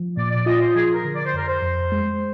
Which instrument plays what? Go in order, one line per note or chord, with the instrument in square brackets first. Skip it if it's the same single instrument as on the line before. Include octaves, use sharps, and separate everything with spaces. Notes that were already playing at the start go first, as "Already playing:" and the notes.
Already playing: [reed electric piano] F3
[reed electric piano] A#2 [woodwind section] D5
[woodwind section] D5
[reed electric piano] F4 [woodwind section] D#5
[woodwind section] C5
[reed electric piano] F3 [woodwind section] G#4
[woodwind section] A#4
[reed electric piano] D3
[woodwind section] D5
C5
[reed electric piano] F2 [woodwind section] A#4
[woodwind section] C5
[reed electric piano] F2
G#3